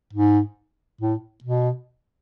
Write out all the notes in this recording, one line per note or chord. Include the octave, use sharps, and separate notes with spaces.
G#2
A2
B2